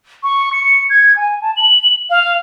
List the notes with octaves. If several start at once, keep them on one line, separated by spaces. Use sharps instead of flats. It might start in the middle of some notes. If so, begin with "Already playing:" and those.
C#6
C#7
G#6
G#5
A5
F#7
F5